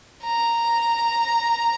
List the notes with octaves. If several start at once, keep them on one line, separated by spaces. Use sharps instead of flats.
A#5